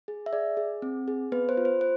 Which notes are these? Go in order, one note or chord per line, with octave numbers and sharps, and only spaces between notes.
G#4
E5
G#4 D5
G#4
C4
G#4
B3 B4
C5
F4
C5
C5